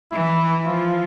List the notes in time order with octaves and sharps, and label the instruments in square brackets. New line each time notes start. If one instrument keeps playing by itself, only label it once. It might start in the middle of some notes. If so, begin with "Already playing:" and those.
[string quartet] E3 [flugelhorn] E4
[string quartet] F3 [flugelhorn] F4